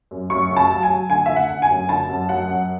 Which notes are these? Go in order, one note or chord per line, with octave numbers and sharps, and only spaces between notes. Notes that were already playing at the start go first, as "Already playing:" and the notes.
F#2
F#2 C#6
C#3
A5
F#3
G#5
F#3
D3 G#5
D3 E5
F#5
D3
G#5
F#2
D3 A5
F#2
F#3 F#5
F#2